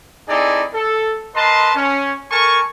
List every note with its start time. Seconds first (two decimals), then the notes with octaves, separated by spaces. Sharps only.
0.29 C4 D#4 E4 G#4 A4 D5
0.73 A4
1.35 A#4 B4 D#5 A5 C6
1.75 C#4
2.31 A4 A#4 G#5 A5 C#6